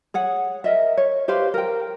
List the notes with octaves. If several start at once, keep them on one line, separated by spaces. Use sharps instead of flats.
G#4 C#5 F#5
A#4 D#5 E5
C#5
G4 B4 C5 F5
A#4 G5